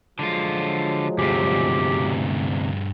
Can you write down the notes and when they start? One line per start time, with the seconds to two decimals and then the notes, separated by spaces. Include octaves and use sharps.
0.19 D3 F3 F#3 G#3 F4
1.19 D2 G2 C3 G4 G#4